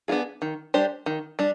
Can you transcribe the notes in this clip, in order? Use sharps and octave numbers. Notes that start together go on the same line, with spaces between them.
B3 D4 F4 G#4
D#3
G3 D4 G4 C5
D#3
G3 D4